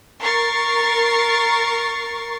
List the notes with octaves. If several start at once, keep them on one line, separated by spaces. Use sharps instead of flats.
A#4 C#6 A6 C7